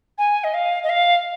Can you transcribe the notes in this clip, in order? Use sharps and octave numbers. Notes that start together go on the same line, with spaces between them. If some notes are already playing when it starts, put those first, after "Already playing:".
G#5
D#5
F5
D#5
F5